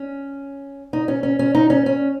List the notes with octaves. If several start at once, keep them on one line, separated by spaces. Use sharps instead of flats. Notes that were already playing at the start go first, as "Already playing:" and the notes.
Already playing: C#4
D#4
C#4
C#4
C#4
D#4
C#4
C#4